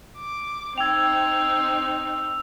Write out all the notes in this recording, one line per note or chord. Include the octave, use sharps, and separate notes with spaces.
D6
C4 D#4 G5 E6 G#6 F7